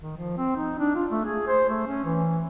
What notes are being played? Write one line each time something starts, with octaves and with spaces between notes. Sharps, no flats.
D#3
F3
C4
D#4
D4
F4
A3
G#4
C5
A3
C#4
E3